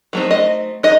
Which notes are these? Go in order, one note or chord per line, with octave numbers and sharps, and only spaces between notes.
F#3 A3 C4 D#4
D#5
D#4 D#5